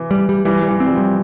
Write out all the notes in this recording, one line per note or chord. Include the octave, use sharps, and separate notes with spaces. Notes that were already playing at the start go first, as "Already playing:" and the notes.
Already playing: E3
G3
G3
E3 G3
G3
E3
C4
G3
F3
G3